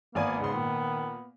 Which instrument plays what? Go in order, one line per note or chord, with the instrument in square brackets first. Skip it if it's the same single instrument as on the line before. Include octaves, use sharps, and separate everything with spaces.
[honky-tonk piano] G#1 D5 G#5 [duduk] A#3 [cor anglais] B3
[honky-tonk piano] G#2 C6 [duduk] C#3
[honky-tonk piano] A#2 [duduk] D#3